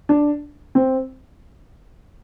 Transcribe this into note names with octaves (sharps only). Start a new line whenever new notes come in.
D4
C4